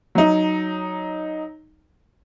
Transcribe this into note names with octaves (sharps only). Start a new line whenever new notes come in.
F#3 D#4